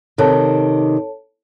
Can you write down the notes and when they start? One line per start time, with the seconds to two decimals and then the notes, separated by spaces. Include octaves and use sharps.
0.18 C3 D#3 A4 C#5 A5